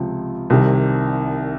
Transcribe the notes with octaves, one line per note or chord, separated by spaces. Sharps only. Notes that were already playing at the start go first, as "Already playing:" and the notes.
Already playing: C#2 C3 F3
C2 C3 D#3 G3